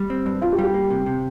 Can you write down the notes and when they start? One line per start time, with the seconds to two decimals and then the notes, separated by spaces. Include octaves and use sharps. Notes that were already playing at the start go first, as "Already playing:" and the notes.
Already playing: G3
0.10 C4
0.26 G2
0.42 G2 F4
0.53 G4
0.59 G3
0.64 G4
0.74 A#3
0.90 C3
1.06 C3